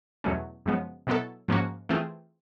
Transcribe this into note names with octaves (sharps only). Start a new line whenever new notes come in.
E2 B2 F#3 A3 C#4
F#2 C#3 F3 G#3 B3
B2 F#3 B3 E4 A4
G#2 F3 A#3 C#4 F#4
E3 A3 C4 F4 G#4